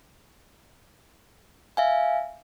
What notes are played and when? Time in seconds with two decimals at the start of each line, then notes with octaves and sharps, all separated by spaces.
1.77 E5 F5 G#5